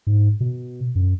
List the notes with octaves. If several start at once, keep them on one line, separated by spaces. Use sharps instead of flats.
G#2
B2
F#2